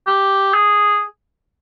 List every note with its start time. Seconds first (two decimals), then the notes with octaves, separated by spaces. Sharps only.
0.07 G4
0.54 G#4